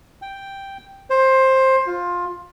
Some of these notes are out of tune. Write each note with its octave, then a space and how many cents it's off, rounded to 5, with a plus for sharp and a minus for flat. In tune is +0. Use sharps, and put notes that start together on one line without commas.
G5 +0
C5 +15
F4 +15